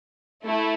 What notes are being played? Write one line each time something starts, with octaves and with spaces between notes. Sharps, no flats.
A3 E4